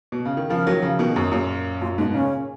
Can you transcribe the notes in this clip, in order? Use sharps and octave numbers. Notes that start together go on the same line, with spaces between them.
B2
C#3
D#3
C#3 F3 A#4
D#3 F#3
C#3 F3
B2 D#3
F#2 G#4
F#2 A#2
F#2 A#2 F4
G#2 B2 D#4
A#2 C#3 C#4